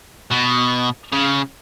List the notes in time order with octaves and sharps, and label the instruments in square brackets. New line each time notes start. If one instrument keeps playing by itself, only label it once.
[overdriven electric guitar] B2
C#3